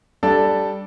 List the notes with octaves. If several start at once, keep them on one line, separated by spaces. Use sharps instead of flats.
G3 D4 A4 D5